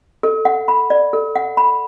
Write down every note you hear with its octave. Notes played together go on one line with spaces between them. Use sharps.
A4
F#5
B5
D5
A4
F#5
B5